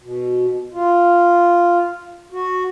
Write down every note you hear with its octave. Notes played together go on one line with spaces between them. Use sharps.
B2
F4
F#4